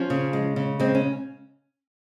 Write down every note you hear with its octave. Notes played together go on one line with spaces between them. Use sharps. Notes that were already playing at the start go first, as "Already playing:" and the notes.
Already playing: F3 C#4
C#3
G#3
C#3
G#3 C4
C#4